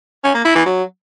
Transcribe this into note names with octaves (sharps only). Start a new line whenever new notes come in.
C#4
A#3
E4
E3
F#3